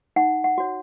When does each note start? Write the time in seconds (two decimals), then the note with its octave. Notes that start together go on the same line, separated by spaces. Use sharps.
0.16 D#4 F#5
0.44 F#5
0.58 F#4 C#5